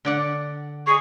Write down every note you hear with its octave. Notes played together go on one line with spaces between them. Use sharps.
D3 D5 F#5
G#4 C#6